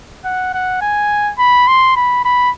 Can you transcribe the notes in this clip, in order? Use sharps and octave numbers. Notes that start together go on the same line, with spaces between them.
F#5
F#5
G#5
B5
C6
B5
B5